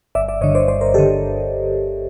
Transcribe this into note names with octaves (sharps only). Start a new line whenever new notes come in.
G1 D5 E5
D5 E5
G2 D3 C#5 D#5
C5 D5
G1 C5 D5
A#4 C5
G4 A4
D3